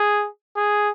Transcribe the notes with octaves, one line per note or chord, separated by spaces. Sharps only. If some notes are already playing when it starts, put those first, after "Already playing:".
Already playing: G#4
G#4